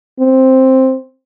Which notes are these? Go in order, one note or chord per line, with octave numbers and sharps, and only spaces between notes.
C4